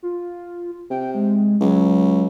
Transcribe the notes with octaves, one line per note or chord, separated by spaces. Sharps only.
F4
C3 G5
G#3
C#2 F#3